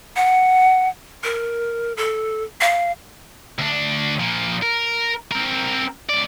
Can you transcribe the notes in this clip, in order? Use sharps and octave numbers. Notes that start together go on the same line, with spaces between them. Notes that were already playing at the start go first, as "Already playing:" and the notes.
F#5
A#4
A4
F5
D2 D4
A#2 F3
A#4
C4 A#4
C#2 D5